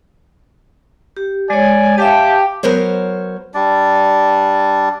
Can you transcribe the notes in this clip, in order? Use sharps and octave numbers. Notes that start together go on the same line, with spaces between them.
G4
G#3 C#5 D5 G#5
G4 E5 F5 A5
F#3 B3 A#4 C5 C#5
G3 D4 D5